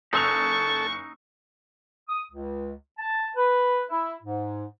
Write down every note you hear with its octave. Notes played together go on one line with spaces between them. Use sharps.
F#1 D#4 A4 C#6 E6 F7
D#6
C#2
A5
B4
E4
G#2